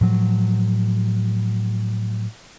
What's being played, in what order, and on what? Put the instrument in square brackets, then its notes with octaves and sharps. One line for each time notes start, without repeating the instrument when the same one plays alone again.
[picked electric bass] A2 F3 F#3